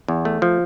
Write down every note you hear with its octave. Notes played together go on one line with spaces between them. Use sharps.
E2
A3
F3